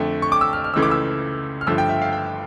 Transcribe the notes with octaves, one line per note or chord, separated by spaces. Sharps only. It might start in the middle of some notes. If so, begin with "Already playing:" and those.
Already playing: F2 D3 A3
C#6
D6
E6
F6
F6
C#2 C#3 E3 A3 E6
D6
E6
F6
G1 G2 F3 A3 E6
G5
E5
F5
G5